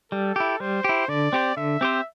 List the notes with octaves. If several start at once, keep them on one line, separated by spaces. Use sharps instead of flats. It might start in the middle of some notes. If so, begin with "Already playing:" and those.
G3 A4
E4 G4
G3 C5
E4 G4
D3 D5
C4 G4 C5
D3 E5
C4 G4 C5